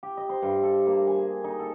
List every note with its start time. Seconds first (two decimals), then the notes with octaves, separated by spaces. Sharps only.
0.03 G4
0.17 D#5
0.29 C5
0.42 G2
0.64 A4
0.86 A#3
1.07 G#5
1.19 G#4
1.44 D#4
1.60 A4